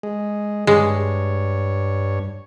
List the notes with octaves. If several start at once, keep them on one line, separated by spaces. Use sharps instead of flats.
G#3
G2 G#3 C#5